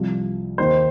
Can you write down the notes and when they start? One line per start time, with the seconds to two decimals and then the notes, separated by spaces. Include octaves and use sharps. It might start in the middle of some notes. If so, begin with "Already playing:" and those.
Already playing: C2 C3 F3
0.58 D#2 D#3 C5